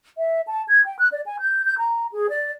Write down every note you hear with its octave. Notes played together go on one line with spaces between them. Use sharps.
E5
A5
G#6
G5
F#6
D5
G#5
G6
G6
A#5
G#4
D5